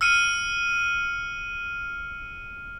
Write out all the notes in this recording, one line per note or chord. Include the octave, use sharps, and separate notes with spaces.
E6 F6 C#7 D#7